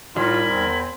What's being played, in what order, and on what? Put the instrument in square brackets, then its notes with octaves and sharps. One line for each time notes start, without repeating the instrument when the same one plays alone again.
[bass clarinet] A2 [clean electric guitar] D#3 G3 [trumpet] F4 [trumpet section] A#4 G#5 B5
[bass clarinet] E2 [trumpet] C4